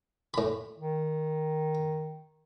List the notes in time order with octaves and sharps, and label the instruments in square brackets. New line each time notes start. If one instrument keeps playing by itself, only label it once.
[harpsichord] A2 B5
[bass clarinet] D#3